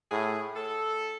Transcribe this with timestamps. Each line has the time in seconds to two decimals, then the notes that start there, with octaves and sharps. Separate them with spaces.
0.12 A2 G#4
0.56 A4